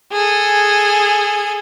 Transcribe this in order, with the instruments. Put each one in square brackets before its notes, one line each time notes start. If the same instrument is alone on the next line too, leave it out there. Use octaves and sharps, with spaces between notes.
[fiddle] G#4 A4